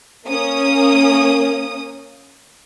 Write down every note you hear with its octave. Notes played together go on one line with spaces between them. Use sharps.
A#3 C#4 D#6